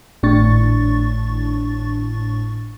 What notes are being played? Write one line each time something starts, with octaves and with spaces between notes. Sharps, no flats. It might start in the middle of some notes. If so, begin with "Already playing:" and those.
G#1 A2 D4 C#6 A6